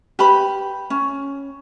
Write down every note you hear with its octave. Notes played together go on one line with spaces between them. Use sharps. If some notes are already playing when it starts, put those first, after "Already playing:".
G4 B4 B5
C#4